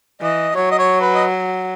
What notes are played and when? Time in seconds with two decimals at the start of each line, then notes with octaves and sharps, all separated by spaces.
0.21 E3 D#5
0.55 F#3 C#5
0.71 D#5
0.79 C#5
1.01 B4
1.15 D#5